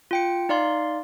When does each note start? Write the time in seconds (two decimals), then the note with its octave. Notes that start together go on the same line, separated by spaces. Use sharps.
0.11 F4 G5 C#7
0.49 D#4 D5 F5 C6